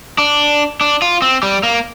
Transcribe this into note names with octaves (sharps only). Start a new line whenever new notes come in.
D4
D4
F4
C4
G3
A#3